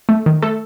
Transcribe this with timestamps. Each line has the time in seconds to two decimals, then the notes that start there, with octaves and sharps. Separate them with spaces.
0.09 A3
0.26 D#3
0.42 A3 A4